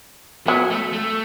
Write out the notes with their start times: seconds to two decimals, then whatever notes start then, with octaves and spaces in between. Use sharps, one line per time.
0.47 F#3 B3
0.71 A3
0.93 A3